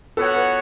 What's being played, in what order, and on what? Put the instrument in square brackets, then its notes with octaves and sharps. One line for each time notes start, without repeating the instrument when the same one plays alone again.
[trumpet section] B3 F#4 C#5 F#5 [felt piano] A4
[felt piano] B4